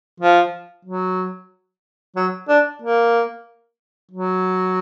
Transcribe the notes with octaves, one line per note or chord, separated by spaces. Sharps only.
F3
F#3
F#3
D4
A#3
F#3